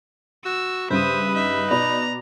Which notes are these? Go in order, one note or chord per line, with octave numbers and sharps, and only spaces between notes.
F#4 E6
G2 C#3 B4 C5 E5 D#6
D#4 E5
B2 D5 A#5 B5